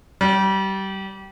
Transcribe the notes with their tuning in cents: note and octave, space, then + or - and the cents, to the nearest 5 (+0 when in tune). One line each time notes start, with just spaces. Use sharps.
G3 -25